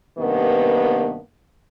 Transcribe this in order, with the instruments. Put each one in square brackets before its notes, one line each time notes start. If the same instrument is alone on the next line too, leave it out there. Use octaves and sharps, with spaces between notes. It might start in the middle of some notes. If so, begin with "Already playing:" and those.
[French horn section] G2 C3 D#3 A#3 B3